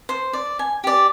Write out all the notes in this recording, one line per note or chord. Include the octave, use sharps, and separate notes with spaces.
C5
D5
G#5
G4 D5